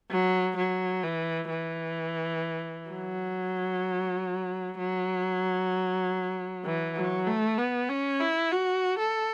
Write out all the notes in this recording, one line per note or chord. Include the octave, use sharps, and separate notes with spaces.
F#3
F#3
E3
E3
F#3
F#3
E3
F#3
A3
B3
C#4
E4
F#4
A4